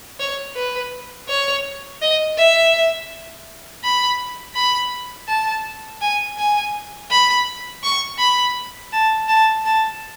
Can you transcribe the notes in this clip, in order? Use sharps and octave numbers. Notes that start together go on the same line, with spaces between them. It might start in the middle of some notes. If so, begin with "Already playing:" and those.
C#5
B4
C#5
D#5
E5
B5
B5
A5
G#5
G#5
B5
C#6
B5
A5
A5
A5